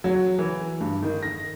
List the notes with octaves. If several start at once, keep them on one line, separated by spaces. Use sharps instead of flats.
F#3
E3
G2
D#3
A#6